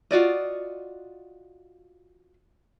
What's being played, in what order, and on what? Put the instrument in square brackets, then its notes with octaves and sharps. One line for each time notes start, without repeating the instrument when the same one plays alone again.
[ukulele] F4 F#4 D5 D#5